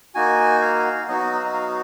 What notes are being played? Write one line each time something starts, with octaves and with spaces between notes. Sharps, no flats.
A#3 D#4 F#4 G#5
F5
F#3 B3 D#4 F#4 D#5
F5
D#5
F5